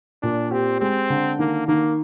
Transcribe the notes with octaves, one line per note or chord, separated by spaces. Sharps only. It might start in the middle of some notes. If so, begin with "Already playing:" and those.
A#2 D4
C4 G4
G#3 C4
D3
D#3 A#3
D#3 A#3